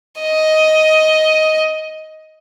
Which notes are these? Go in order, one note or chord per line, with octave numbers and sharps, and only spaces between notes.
D#5